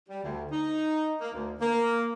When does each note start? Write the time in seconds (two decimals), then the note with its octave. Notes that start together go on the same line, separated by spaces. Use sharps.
0.08 G3
0.23 D2
0.51 D#4
1.21 A#3
1.33 D2
1.60 A#3